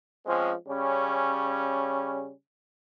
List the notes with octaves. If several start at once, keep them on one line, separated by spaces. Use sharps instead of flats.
F3 G#3 C4 C#4
C#3 G3 C#4